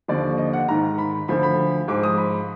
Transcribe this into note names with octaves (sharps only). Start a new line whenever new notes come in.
D#2 D3 F3 D5
D#5
F#5
G#2 D#3 A#5
B5
D2 D3 F3 B5
B5
G#2 F3 D6
D#6
B5